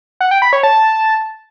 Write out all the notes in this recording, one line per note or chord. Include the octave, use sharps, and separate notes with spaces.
F#5
G5
B5
C#5
A5